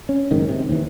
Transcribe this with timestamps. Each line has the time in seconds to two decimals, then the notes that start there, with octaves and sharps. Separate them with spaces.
0.09 C#4
0.31 F#1 G#2 D#3
0.49 C3
0.69 D#2 E3